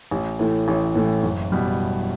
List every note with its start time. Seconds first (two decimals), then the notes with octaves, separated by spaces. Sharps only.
0.11 A1
0.39 A2 E3 A3
0.68 A1
0.96 A2 E3 A3
1.23 F#1
1.52 B2 G3